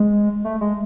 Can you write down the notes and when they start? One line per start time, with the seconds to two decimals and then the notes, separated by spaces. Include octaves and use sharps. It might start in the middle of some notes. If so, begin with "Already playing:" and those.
Already playing: G#3
0.45 A3
0.61 G#3